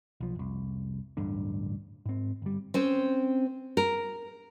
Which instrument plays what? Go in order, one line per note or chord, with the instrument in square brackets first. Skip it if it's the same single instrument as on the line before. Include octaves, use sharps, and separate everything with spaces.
[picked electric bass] B1 F3
F1 C2
D1 A1 G2 D3
G#2 C4
G1 G3
[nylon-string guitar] C4 C#4 C5
A#4